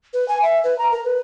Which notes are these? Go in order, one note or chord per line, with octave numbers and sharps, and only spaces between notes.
B4
G#5
E5
B4
A#5
A#4
B4